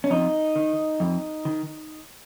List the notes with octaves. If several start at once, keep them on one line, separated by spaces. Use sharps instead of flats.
C#4
F2 D#4
D#3
F2
D#3